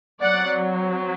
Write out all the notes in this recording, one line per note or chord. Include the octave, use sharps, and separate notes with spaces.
F#3 C4 D5 F#5